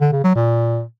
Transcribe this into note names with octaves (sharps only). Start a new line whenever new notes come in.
D3
C#3
F#3
A#2